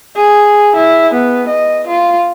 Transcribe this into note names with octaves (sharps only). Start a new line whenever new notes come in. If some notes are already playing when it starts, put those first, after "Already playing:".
G#4
E4
B3
D#5
F4